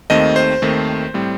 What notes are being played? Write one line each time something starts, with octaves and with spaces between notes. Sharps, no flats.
D#2 D#3 A3 C4 D#5
C5
D#2 D#3 A3 C4
A2 G3 C4